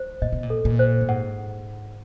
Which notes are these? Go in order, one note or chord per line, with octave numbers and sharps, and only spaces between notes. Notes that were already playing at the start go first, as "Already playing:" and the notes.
Already playing: C5
A#2 D#5
B2
A#2
A4
A#2
C5
A2
G#2 F#5